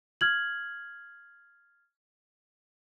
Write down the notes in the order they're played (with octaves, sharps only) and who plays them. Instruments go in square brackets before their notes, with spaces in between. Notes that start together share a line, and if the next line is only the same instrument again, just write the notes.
[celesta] F6 G#6 F#7